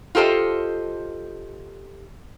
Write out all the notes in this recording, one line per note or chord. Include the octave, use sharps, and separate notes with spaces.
F4 G4 A4 C5 D#5